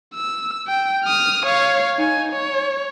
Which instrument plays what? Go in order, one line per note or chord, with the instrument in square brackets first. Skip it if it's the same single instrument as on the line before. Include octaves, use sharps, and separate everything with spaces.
[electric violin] E6
G5
D#6 F6
C#5 F5
D#4 G#5
C#5